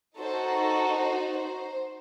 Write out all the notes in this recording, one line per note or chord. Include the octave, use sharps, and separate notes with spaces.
D#4 F#4 A4 C5
A4
C5
C5